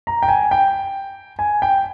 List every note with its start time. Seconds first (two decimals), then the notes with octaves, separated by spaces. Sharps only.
0.07 A#5
0.23 G5
0.28 G#5
0.51 G5
1.39 G#5
1.62 G5